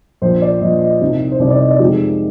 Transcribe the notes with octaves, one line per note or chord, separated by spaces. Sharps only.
A#1 A#2 F3 C5
D5
A#1 A#2 F3 D#5
D#5
C2 C3 D#3 G3
C5
C2 C3 D#3 G3 D5
D5
D#5
D5
F2 D#3 G#3 G4